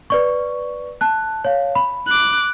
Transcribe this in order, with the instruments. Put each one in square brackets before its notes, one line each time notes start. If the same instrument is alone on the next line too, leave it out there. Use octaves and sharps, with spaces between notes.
[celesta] B4 D5 C#6
A5 F#6
C#5 F5
B5
[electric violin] D6 F#6